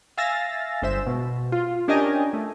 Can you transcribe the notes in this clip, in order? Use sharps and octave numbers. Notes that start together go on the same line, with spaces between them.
E5 F5 G#5 E6 A6 A#6
G1 G#3 C5 E5 E7
B2
F4
C#4 D4 G4 A#4 D#5 G#5
A3